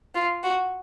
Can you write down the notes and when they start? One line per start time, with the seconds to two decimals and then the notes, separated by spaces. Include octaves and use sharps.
0.15 F4
0.43 F#4